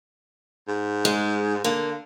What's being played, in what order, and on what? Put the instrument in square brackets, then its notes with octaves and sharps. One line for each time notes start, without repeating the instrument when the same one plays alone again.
[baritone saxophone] G#2
[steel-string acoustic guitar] G#3
[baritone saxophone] D3 [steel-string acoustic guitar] A#3